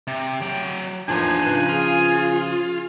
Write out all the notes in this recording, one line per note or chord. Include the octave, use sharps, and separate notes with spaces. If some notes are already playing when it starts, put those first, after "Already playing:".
C3
F#3 G5
E2 F3 A#3 D4 D#4 G#5
C#3 F3 B4
F4 G#4